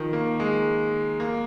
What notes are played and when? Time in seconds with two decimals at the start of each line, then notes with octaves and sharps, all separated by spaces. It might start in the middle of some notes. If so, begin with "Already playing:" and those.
Already playing: D#3 F3
0.13 A#3
0.40 G#3
1.20 A#3